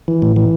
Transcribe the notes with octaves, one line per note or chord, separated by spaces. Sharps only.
E3
A2
E3